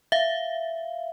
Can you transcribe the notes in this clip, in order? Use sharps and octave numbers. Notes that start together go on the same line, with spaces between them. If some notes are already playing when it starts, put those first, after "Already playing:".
E5 F5